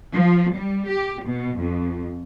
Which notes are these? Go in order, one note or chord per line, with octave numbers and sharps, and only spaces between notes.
F3
G3
G4
B2
F2